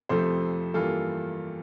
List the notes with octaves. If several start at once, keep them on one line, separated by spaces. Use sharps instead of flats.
F2 C3 F3 A3 A4 C5
G2 E3 G3 A#3 F4 A4